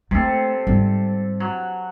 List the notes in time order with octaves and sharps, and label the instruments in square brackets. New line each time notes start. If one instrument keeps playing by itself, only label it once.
[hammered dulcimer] C3 A4 [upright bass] A3 A#3
[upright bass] G#2 G3
[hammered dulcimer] F#3